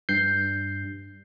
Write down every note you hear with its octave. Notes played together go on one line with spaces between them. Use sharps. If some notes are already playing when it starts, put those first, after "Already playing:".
G2 G6 C7